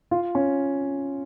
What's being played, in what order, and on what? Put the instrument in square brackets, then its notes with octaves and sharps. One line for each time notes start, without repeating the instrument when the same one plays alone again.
[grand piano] F4
C#4